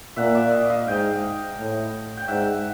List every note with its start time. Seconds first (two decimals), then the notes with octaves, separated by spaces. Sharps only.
0.16 A#2 E5 F#5
0.35 D5 E5
0.52 D#5 F5
0.70 D#5 F5
0.87 G#2 F5 G5
1.58 A2
2.17 G5
2.28 G#2 E5 F#5